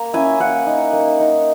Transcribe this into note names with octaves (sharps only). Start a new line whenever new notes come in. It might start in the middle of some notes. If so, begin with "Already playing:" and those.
Already playing: A#3 A#5
C#4 E4 G#5
A#3 F#5
D#4
A#3
D#4